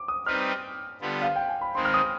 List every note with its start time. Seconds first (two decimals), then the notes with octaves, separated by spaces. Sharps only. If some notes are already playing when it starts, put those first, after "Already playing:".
Already playing: D6
0.08 D#6
0.26 G3 C4 D#4 B4 F6
1.01 D3 G3 B3 F4 B4
1.22 F5
1.36 G5
1.48 G#5
1.61 B5
1.75 D#3 G#3 C4 C6
1.85 F6
1.94 D#6